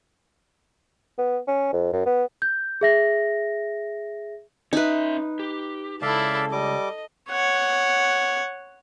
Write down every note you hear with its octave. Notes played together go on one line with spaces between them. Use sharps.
B3
C#4
F2
F#2
B3
G6
G#4 E5 A#6
C#4 D#4 B4 E5
G4
C#2 E4 A4 D5 E5 F5
G3 D#5 D6
C#5 F#5